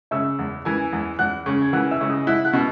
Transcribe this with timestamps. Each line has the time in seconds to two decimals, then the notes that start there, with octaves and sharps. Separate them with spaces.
0.11 C#3 E5 E6
0.39 E2
0.65 E3 G#5 G#6
0.93 E2
1.19 E2 F#5 F#6
1.46 C#3
1.62 G#6
1.73 E3 F#5 F#6
1.91 E5 E6
2.01 C#3
2.08 D#5 D#6
2.27 E4 F#5 F#6
2.45 F#5 F#6
2.53 B2